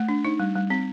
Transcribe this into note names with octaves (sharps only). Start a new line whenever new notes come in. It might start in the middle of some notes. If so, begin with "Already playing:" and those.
Already playing: A3
D4
D#4
G3
G3
C4